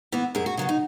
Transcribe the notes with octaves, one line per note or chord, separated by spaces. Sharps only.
E3 B3
F#2 G#4
F#4
C#3 F#3 B3
D#4